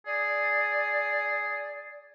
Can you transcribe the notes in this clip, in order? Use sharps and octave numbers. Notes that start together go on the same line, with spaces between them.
G#4 D5